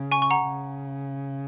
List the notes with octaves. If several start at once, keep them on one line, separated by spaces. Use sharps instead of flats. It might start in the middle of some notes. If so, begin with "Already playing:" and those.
Already playing: C#3
G#5 C#6
C#6
F#5 A#5
C#3